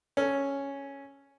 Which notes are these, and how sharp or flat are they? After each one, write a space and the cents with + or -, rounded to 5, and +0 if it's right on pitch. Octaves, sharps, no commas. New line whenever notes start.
C#4 +0 A4 +0